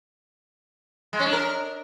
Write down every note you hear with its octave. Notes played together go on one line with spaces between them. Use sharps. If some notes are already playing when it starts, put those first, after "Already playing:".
G#3
C#4
D4
A#4